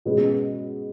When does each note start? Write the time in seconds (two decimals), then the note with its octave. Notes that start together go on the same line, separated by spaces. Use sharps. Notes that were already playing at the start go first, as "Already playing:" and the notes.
0.05 B2 G#3 C#4 G#4 B4